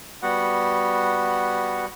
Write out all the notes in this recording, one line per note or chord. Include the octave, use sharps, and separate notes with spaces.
G3 B3 F#4 F#5